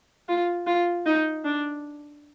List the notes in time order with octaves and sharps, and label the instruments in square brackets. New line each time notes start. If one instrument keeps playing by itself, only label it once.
[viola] F4
F4
D#4
D4